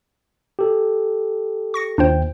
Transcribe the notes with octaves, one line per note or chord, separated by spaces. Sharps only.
G4 A4
C#6 A#6 C#7
D#2 D4 F4 C5 G5